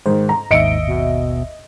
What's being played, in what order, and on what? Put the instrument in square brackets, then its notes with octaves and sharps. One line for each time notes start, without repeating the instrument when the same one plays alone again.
[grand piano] G#2 [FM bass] D#3 [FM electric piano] C5
[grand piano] A#5
[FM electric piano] G#1 D#2 E5 [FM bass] G#2 [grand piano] D#5 C#7 D7
[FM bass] B2